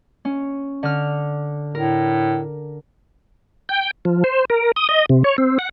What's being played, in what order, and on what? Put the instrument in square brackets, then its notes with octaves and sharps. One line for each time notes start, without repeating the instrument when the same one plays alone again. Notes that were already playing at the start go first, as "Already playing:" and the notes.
[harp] C#4
D3 F6
[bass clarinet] A2 [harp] A#4
[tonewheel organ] G5
F3
C5
A#4
D#6
D#5
C3
C#5
C4
F#5